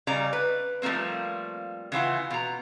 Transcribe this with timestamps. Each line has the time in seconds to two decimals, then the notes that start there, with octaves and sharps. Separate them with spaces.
0.07 C#3 G3 D5 A#5
0.33 B4
0.82 F3 G3 A3 A#3 C4
1.92 C#3 E3 F4 F#5
2.30 B2 A#5